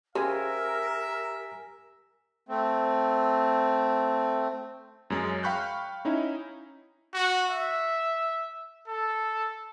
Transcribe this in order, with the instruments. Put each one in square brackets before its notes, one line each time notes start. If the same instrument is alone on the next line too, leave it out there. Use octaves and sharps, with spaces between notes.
[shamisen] C#3 G#4 C5 [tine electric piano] G4 G#5 [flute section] A#4 [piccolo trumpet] E5
[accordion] A3 C4
[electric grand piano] F#2 G#3 C#4
F5 G5 B5 C#6 F#6 G6
C#4 D#4 E4
[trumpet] F#4
E5
A4